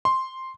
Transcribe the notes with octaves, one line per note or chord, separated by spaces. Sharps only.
C6